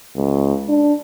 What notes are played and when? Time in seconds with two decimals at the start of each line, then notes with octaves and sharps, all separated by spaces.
0.16 C#2
0.69 D4